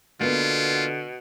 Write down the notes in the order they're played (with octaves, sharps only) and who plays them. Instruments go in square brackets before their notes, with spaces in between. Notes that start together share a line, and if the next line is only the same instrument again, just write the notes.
[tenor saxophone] B2 [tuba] D3 [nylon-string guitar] A#3 B3 [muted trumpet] F4